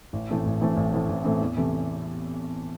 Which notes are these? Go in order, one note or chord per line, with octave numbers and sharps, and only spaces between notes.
A1
A2 E3 A3 C4
A1
A2 E3 A3 C4
A1
A2 E3 A3 C4
A1
A2 E3 A3 C4
E2
C3 E3 A3